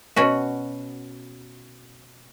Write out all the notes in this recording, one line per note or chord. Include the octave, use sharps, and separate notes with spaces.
B2 C#4 F#4